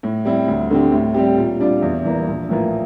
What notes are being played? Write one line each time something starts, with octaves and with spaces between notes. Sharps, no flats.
A2
G3 C4 E4
D2
D3 A3 C4 G4
A2
G3 C4 G4
A#2
G3 D4 F4
E2
E3 A#3
A#1
A2 E3 A#3 F4